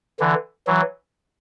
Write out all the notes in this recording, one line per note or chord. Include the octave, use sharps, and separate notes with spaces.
D3 E3
E3 F#3